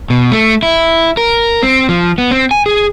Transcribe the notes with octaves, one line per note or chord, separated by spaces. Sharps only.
B2
A3
E4
A#4
C4
F3
B3
C4
G#5
G#4